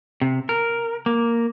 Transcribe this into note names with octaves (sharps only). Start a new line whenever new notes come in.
C3
A#4
A#3